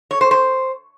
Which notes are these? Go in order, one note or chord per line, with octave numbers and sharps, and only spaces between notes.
C#5
C5
C5